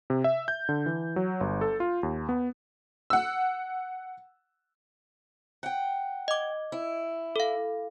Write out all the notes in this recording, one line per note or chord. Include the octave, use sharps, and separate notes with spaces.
C3
E5
G6
D3
E3
F#3
G1
A4
F4
D#2
B3
F#5 E6
F#5 G5
D#5 D6
E4
A4 F5